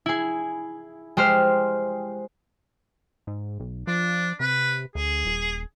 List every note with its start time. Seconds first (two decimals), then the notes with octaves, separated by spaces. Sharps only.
0.06 E4 G#4
1.17 G#3 G4 C5 C6 F6
3.27 G#2
3.60 B1
3.87 F3 D4
4.40 C3 B4
4.95 D2 G#4
5.25 D#1